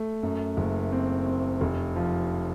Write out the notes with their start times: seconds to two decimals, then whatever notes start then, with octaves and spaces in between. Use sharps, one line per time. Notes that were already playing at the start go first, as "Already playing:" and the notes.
Already playing: A3
0.23 F#2
0.57 F#1
0.92 C4
1.27 C4
1.61 F1
1.96 F3